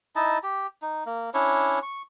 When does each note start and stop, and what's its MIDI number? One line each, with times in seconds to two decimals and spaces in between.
0.16 0.38 63
0.16 0.38 64
0.16 0.38 75
0.16 0.38 81
0.43 0.67 67
0.82 1.04 63
1.06 1.30 58
1.34 1.79 61
1.34 1.79 62
1.34 1.79 64
1.34 1.79 73
1.83 2.02 85